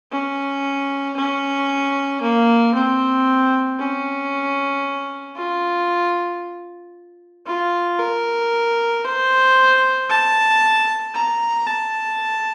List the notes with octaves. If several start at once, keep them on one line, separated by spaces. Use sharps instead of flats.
C#4
C#4
A#3
C4
C#4
F4
F4
A#4
C5
A5
A#5
A5